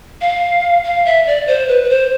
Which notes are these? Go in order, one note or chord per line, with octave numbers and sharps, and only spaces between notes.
F5
F5
E5
D5
C5
B4
B4
C5